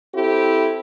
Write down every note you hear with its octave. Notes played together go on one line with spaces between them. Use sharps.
C4 E4 G4 A4